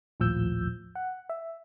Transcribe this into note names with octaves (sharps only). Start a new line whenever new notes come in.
A#1 D#2 A2 F3 E6 G6
F#5
E5